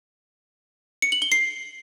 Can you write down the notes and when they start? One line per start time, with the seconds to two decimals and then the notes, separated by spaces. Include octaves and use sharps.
1.02 C#7
1.12 F#7
1.22 G7
1.32 C7